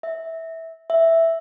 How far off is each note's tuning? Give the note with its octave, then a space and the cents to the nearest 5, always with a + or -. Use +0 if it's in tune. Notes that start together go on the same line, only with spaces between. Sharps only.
E5 -15
E5 +0